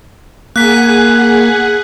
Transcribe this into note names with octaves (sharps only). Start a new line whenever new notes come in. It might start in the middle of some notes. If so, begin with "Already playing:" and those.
A#3 G#4 F#5 G#5 F#6 B6